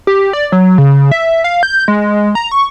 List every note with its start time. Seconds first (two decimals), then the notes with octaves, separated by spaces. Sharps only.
0.07 G4
0.33 D5
0.52 F#3
0.78 C#3
1.11 E5
1.44 F5
1.63 G6
1.88 G#3
2.35 A#5
2.52 C#6